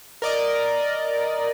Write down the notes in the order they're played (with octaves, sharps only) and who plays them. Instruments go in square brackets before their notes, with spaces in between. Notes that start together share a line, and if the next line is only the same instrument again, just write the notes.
[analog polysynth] A#4 D5 D#5